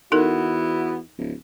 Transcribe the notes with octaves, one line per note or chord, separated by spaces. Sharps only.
E2 B3 D#4 E4 F#4 A4 A#4
D1